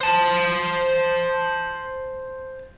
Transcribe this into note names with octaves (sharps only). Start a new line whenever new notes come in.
C5 A5